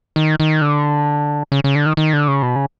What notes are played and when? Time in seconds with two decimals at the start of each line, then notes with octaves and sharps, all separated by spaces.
0.16 D#3
0.40 D#3
0.62 D3
1.52 C#3
1.64 C#3
1.75 D3
1.86 D#3
1.97 D#3
2.13 D3
2.28 C#3
2.42 B2
2.56 C#3